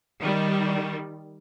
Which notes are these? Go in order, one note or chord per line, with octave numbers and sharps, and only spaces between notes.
D#3 G3